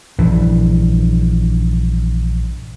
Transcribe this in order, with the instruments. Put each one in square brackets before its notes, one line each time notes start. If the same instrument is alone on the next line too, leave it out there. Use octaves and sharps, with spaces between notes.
[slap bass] A#1 G2 E3